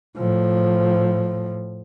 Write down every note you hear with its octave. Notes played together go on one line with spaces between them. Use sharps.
A2 F3